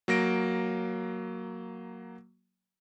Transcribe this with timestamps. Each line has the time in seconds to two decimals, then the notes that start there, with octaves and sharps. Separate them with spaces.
0.08 F#3 A#3 A#6 D7